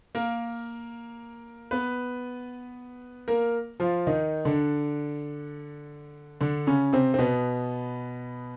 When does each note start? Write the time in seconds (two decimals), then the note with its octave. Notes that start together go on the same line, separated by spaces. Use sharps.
0.15 A#3 A#4
1.71 B3 B4
3.28 A#3 A#4
3.80 F3 F4
4.07 D#3 D#4
4.45 D3 D4
6.41 D3 D4
6.67 C#3 C#4
6.93 C3 C4
7.14 C4
7.19 B2 B3